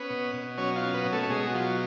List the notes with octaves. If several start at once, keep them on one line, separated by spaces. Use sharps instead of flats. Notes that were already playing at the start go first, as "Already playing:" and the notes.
Already playing: B3 C#4 B4
B2
B2
F#3 C#4 C#5
F4 F5
C#4
B3 B4
B2
A3 A4
A4
B2 G#3 G#4
F#4
F#3 F4